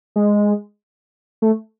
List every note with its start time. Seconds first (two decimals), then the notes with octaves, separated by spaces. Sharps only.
0.16 G#3
1.42 A3